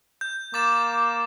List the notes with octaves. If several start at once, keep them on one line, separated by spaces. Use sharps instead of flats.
G6
A#3 D6 A6 E7